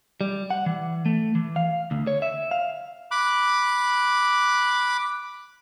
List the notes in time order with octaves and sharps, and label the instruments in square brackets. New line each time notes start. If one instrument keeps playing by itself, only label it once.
[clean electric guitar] G3
F#5
E3
A3
E3
F5
D2
C#5
E5
F5
[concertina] B5 D6 F#6